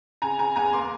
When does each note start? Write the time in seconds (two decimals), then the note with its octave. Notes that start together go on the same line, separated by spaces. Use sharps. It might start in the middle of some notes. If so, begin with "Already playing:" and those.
0.22 C#3 G#5 A#5
0.39 C#3 G#5 A#5
0.56 E2 G#5 A#5
0.73 A#3 C6 D6